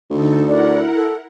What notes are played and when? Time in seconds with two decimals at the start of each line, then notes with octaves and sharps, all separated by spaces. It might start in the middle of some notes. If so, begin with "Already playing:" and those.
0.10 D2 D3 D#4 A4
0.48 E4 A#4 D5 F#5
0.95 A4